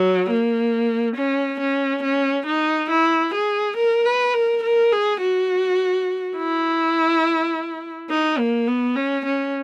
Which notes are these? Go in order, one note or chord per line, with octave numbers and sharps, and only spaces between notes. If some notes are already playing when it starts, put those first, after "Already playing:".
Already playing: F#3
A#3
C#4
C#4
C#4
D#4
E4
G#4
A#4
B4
A#4
A#4
G#4
F#4
E4
D#4
A#3
B3
C#4
C#4